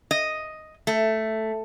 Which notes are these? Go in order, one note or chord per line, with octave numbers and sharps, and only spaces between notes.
D#5
A3